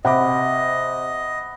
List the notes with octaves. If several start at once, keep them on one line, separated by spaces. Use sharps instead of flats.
C3 D#5 F#5 B5 D6